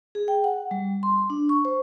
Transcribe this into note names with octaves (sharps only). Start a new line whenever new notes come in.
G#4
G5
F#5
G3
C6
D4
C#6
C5